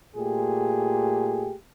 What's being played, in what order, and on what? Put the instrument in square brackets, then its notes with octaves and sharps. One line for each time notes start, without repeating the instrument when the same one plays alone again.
[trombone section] A#2 A3 G4 G#4